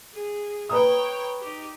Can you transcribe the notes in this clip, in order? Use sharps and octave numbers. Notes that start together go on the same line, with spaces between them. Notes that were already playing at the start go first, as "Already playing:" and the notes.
G#4
B4 C#5 G5 A#5 D#6
D#4 G4